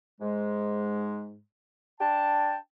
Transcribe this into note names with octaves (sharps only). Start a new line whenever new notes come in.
G#2 G#3
D4 G5 A5